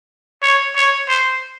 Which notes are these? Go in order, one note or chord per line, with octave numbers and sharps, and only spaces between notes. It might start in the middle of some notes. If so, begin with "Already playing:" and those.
C#5
C#5
C5